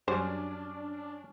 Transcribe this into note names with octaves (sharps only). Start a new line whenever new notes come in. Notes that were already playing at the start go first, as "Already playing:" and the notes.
F#2 F#3 G3 C#4 D4 C5 D5 G#5